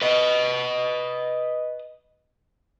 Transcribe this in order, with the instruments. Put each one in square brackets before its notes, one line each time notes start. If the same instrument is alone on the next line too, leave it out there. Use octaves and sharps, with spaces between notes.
[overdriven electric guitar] B4 D#5